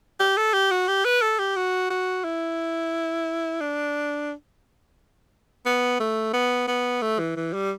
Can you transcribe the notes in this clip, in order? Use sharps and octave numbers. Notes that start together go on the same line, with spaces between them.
G4
A4
G4
F#4
G4
B4
A4
G4
F#4
F#4
E4
D4
B3
A3
B3
B3
A3
E3
E3
G3